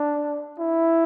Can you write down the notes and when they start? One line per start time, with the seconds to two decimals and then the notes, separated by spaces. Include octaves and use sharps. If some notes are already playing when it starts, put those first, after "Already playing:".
Already playing: D4
0.59 E4